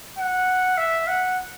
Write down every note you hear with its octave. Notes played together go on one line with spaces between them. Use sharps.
F#5
E5
F#5